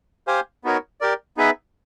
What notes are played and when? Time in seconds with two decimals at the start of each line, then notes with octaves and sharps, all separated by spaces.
0.27 G4 C5 F5 G#5
0.64 B3 D#4 F#4 A#4 C#5
1.01 G4 A#4 D5
1.37 B3 D#4 G#4 B4 E5